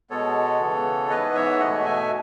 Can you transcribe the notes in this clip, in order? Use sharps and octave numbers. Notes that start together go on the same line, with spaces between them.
B2 G#3 B3 A4 C#5
C#3 E3 B3
G#2 E3 B3 B4 D#5
C#5 E5
B2 A3 D#5 F#5
E5 G#5